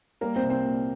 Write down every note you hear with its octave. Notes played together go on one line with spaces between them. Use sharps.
G3 A#3 A#4
C4 C5
C2
C4 C5
A#2